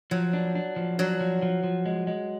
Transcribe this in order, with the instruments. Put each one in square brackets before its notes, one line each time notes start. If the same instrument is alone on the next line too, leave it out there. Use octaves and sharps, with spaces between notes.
[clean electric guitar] F3 [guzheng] F#3
[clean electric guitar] D4
D4
F3
[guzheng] F#3 [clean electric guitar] D4
[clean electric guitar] F3
F3
F3
G#3
G#3